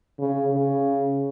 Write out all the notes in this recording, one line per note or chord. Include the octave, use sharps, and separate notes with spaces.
C#3
C#3